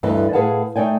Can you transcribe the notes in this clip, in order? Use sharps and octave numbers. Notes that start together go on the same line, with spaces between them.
D2 G2 D3 E3 B4 D#5
A2 G#4 B4 F5 F#5 A5
A3 D#4 D5 G5 G#5